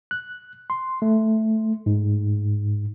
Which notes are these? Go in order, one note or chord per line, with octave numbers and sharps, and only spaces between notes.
F#6
C6
A3
G#2